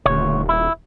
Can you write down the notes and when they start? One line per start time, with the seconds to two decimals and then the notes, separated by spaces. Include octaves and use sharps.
0.06 D#1 D2 C#5
0.49 E4